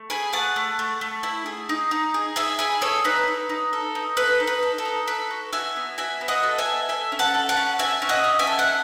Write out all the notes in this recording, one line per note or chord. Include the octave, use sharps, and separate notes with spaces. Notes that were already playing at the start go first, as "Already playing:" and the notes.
Already playing: A3
G#4 G#5 B5
A3 F#5 A5
A3
A3
A3
E4
G#4
D#4
D#4
G#4
G#4 E5 G#5
G#4 G#5 B5
G#4 A4 C#5
D#4 B4
D#4
D#4
A4
D#4
A4 B4
D#4
B4
A4
A4
D#4
A4 B4
F#4
F#4 E5 G#5
B3
F#4 E5 G#5
B3
D#5 F#5
A4
E5 G#5
A4
A4 E5 G#5
C#4
F#5 A5
A4
F#5 A5
C#4
F#4 E5 G#5
C#4
D#5 F#5
C#4
E5 G#5
A4
F#5